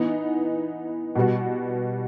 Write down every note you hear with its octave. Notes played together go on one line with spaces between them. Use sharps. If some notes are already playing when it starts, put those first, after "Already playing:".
Already playing: E3 B3 D#4
B2 G3 B3 F#4